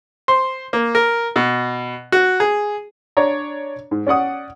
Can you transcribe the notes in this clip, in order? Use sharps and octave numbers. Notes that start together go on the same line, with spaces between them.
C5
A#3
A#4
B2
F#4
G#4
D4 C#5 D5 A#5
G#2
C#4 D5 F#5 D#6